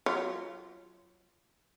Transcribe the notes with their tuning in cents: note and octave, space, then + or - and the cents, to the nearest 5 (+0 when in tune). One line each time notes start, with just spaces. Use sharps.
F#3 +0 F4 -20 C#5 +20